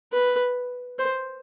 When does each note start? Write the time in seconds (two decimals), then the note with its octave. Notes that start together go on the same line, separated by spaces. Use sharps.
0.12 B4
0.99 C5